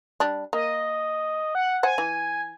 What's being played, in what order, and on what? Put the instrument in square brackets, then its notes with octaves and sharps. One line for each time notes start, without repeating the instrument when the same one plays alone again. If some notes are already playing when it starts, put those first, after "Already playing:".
[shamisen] G3 D4
[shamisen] A#3 [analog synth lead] D#5
[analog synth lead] F#5
[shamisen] C5 F#5 [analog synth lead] G#5
[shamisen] E3